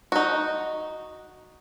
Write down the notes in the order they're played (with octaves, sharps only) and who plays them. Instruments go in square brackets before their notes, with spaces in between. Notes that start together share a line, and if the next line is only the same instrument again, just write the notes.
[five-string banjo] D#4 F#4